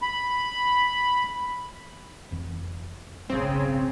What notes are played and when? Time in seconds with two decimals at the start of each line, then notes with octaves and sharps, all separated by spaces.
0.02 B5
2.31 F1 F2 E3
3.30 F#1 B1 G#2 C#3 C4